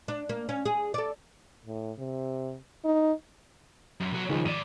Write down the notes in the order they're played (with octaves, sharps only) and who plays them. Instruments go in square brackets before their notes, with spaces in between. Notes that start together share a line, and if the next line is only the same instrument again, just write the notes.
[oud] D4
A#3
C#4
G#4
A4 D5
[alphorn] A2
C3
D#4
[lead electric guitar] F#2
B1 F#3
[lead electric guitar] C#2 [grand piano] D#3 F3 G#4
[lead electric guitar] G#2 D5 [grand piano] D#7 E7